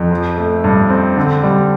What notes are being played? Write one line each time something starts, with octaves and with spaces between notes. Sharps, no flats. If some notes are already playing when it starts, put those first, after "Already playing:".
Already playing: F2
F3
A3
G2
C4
D3
G3